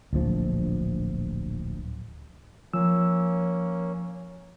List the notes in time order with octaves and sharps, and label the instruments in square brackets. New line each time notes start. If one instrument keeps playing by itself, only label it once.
[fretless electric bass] D1 A#1 F3
[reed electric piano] F3 E6 [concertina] A#3 C#4